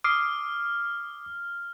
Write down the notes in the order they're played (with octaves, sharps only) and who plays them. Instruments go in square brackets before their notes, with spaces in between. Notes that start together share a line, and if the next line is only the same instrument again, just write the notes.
[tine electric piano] D6 D#6 C7 [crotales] F6